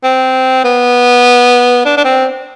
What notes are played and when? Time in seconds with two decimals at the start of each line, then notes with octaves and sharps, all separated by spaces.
0.04 C4
0.64 B3
1.85 D4
1.97 D4
2.04 C4